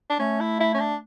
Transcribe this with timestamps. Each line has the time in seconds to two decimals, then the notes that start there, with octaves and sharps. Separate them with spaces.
0.10 D4
0.20 A3 C#4
0.40 E4
0.60 E4
0.74 C#4
0.80 D4